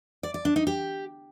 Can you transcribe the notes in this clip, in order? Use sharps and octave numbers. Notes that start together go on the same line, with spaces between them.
D5
D5
D4
D#4
G4